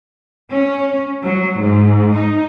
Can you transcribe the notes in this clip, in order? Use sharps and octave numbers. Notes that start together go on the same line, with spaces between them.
C#4
F#3
G#2
D#4